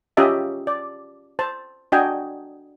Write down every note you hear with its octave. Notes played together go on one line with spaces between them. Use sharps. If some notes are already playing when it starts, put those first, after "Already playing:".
C#4 F4 G4 D#5 E5 A5
D5
C5 A5
D4 F#4 D#5 G5 G#5